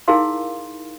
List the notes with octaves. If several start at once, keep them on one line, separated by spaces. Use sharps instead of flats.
D#4 E4 G#4 A#4 F5 C6